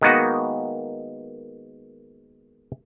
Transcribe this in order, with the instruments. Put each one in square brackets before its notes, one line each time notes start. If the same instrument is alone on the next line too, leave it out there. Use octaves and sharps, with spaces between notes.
[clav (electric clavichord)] D#3 G#3 A#3 B3 D#4 F#4